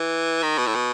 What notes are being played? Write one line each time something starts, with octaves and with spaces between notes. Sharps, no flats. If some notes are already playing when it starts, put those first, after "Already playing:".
Already playing: E3
D#3
B2
A2
B2